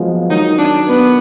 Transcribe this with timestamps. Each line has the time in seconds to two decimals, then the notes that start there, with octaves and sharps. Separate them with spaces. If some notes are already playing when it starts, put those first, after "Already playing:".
Already playing: F3 F#3 G#3 A#3 B3
0.30 D#3 F#3 D#4
0.58 D4
0.87 B3